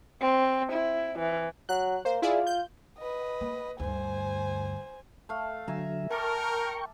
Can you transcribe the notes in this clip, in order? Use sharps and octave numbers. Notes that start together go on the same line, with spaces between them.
C4
E4
E3
F#3 F#6
A#3 C5
E4 F4 G#4 D5
G6
B4 D#5
A#3
D2 G2 C5 G#5
A3 F5
D3 F#3 E5 G#5 A#5
A#4 G5 A5 C#6 D6